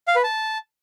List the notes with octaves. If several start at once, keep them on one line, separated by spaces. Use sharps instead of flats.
F5
B4
A5